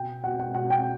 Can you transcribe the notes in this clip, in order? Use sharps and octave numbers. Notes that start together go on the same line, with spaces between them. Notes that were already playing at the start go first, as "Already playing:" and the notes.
Already playing: B2 G5
B2 F#5
F#5
B2 F#5
G5